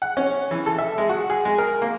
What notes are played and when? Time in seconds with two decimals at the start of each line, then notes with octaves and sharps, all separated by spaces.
0.02 F#5
0.17 C#4
0.51 E3
0.66 A4
0.79 E5
0.98 G#3
1.09 F#4
1.30 G#4
1.45 G#3
1.58 A#4
1.82 A#3